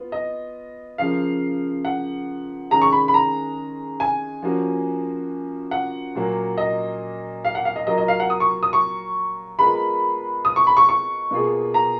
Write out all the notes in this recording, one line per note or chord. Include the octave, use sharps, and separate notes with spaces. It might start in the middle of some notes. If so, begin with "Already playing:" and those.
Already playing: B3 F4
D#5
C#3 F3 A#3 F5
F#5
D#3 G#3 C#4 G#4 A#5
C#6
B5
B5
A#5
G#5
F3 A#3 C#4 F#4
F#5
A#2 F#3 A#3
D#5
F5
F#5
F5
D#5
F#3 A#3 F4 A#4 D#5
D#5
F5
F#5
D#6
C#6
D#6
C#6
G#3 B3 F4 A#4 B5
D#6
C#6
B5
C#6
C#6
B2 A#3 F4 G#4
A#5